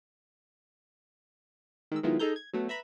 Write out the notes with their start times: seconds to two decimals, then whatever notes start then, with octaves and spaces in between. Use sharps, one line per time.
1.92 D#3 G#3 E6
2.03 D#3 F#3 G#3 B3 E4 F4
2.19 D#4 G#4 A4 A#5 G6
2.36 G#6
2.53 F#3 A3 B3
2.68 B4 E5 A#5 B5